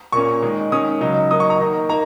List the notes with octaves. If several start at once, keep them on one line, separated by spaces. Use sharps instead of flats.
A#2 A#3 C#4 C#6
D#3 G#3 D#4
D#3 G#3 C#4 D#6
C#3 F#3 D#4
F#3 A#3 D#4 D#6
C#6
A#5
D#3 A#3 D#4
A#3 D#4 A#5